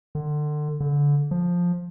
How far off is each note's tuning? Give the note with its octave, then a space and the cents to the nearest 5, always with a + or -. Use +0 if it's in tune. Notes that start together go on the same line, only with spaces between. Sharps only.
D3 +30
D3 -25
F3 +10